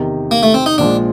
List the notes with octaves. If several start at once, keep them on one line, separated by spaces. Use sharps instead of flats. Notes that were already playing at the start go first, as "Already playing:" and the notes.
Already playing: E2 C3 D#3
A#3
A3
C4
D#4
A#1 A#2 F3 G#3 D4